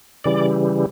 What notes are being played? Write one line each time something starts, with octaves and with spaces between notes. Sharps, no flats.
C#3 E3 G3 D5